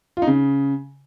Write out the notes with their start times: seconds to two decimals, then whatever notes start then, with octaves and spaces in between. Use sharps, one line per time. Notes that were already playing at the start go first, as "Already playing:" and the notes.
0.17 F4
0.22 D#4
0.27 C#3